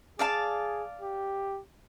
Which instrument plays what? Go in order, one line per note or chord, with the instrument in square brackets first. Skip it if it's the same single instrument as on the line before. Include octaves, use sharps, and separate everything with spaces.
[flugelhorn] G#4 [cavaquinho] D5 F5 A5
[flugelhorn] G4